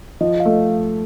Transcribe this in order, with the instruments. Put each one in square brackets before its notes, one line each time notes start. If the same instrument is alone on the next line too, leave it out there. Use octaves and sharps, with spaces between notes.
[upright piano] F3 [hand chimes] D#5
[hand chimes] F5
[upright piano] A3